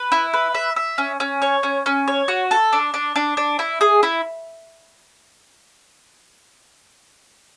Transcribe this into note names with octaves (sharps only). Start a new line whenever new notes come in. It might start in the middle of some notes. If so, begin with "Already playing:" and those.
Already playing: B4
E4
B4
E5
E5
C#4
C#4
C#5
C#4
C#4
C#5
F#4
A4
D4
D4
D4
D4
E4
G#4
E4